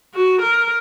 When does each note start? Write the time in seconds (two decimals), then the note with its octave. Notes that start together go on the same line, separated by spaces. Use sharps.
0.14 F#4
0.41 A#4